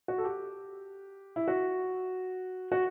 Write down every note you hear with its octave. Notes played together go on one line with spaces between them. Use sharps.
F#4
A4
G4
E4
F#4
F#4